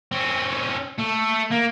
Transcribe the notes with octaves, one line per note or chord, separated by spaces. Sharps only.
C4 C#4
A3
A#3